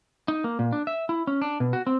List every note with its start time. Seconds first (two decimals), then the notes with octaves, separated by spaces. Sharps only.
0.28 D#4
0.44 A#3
0.59 A#2
0.73 D4
0.87 E5
1.09 E4
1.27 C#4
1.42 D4
1.60 B2
1.73 F#4
1.87 C4